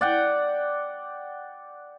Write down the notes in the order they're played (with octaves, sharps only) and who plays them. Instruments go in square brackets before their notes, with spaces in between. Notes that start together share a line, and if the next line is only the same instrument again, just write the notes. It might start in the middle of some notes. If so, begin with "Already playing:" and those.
[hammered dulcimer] D5 F#5 G5